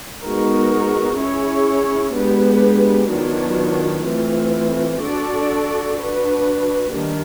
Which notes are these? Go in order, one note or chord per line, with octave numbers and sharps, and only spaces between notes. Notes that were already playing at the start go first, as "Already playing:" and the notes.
G#3 B3 D#4 F#4 A#4
C#4 E4 G#4 C#5
G#3 B3 D4 G4 B4
D#3 F#3 B3 D4 F4
E3 A3 C4 F4
D4 F#4 A4 D5
D4 F#4 B4
D#3 G3 A#3 D4